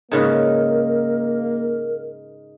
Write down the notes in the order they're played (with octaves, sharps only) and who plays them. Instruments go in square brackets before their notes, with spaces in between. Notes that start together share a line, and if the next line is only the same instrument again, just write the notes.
[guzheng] G#2 C#3 B4 [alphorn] A#3 [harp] D#4 [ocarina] A#4